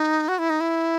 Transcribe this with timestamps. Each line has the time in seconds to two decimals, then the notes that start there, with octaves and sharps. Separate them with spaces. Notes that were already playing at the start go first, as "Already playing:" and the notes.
Already playing: D#4
0.28 F#4
0.39 E4
0.50 D#4
0.60 E4